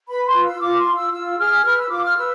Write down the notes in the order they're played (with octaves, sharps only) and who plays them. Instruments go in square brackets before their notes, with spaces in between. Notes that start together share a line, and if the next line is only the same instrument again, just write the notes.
[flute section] B4 B5
C6
F4
E6
F4 D6
C6
F4
E6
F4 E6
G#4 F6
B4 F6
E6
F4 D6
F6
B4 E6